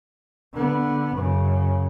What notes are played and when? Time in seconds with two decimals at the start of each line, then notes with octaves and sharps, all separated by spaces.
0.54 D3 B3
1.15 F#2 C#3